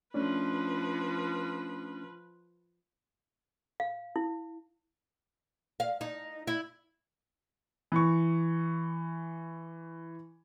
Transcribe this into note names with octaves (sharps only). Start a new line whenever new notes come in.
F3 A3 C#4 D4 B4
F5
E4
F5
D#4
E4
E3 C#6